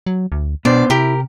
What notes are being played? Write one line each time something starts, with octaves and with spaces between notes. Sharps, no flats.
F#3
D2
B2 B3 D4 C5 D5
C3 E4 G4 A#4